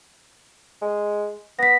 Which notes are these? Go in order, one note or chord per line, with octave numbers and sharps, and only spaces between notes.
G#3
B3 A#6 B6